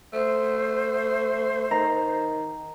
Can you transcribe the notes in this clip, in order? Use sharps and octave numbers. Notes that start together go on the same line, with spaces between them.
A3 C5
D#3 A#5